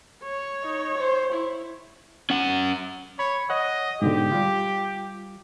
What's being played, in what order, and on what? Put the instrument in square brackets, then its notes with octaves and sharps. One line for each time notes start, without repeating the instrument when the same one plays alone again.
[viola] C#5
[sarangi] D#4
C5
E4
[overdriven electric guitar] C#4 F#5
[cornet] C#5 [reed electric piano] B5
[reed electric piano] C#5 F#5 [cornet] D#5
[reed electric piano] G#2 B2 D3 [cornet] G4
[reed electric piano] G3 F4